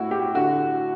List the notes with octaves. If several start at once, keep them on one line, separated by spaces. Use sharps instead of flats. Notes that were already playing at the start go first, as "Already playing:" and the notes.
Already playing: A2 E4 F#4
G4
D3 F#4